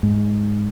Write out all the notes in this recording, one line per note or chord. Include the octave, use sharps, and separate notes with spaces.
G#2